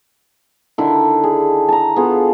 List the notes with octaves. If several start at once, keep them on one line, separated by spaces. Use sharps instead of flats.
D3 D#3 E4
G#4
A5 A#5
B3 F4 G#4 A4